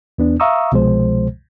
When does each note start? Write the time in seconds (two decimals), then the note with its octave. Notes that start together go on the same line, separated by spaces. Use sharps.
0.18 E2 B3 D4
0.40 E5 F5 A#5 C#6 D#6 E6
0.72 C2 B2 F3 G#3 C5